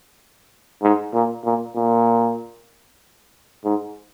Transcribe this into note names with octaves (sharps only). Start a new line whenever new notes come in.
G#2
A#2
A#2
A#2
G#2